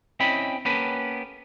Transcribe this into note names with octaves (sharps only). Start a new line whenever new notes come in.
C4 C#4 E4 D#5 G5 B5
A#3 B3 C#4 G4 A4 B4